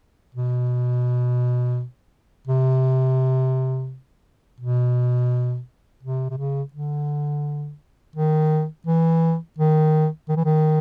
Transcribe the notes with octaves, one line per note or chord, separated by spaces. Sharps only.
B2
C3
B2
C3
C3
C#3
D3
D#3
E3
D#3
D#3
E3
D#3